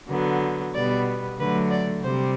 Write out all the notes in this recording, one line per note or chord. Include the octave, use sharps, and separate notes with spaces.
D3 F#3 B3
B2 G3 B3 D5
D3 F#3 A3 B4
D5
C3 G3 C5